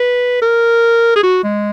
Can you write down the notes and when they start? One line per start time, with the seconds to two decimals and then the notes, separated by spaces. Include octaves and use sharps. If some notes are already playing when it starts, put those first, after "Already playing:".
Already playing: B4
0.42 A#4
1.16 G#4
1.23 F#4
1.44 G#3